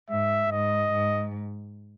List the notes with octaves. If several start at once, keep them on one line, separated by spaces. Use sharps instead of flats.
G#2 E5
G#2 D#5
G#2